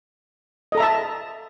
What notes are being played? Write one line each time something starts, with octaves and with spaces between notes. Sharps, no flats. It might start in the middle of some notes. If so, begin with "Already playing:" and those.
A4 D#5 E5 A5 A#5